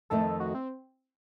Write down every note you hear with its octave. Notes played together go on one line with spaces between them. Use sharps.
F2 D#3 A3 A4
F#4
C4